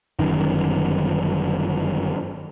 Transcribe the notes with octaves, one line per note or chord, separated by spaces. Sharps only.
G1 F#2 D#3